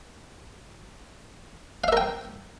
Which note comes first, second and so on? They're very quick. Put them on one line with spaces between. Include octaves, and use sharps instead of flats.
F5 E5 A#4 G5